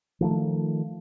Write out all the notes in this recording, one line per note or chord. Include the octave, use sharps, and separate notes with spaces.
D#3 F3 A3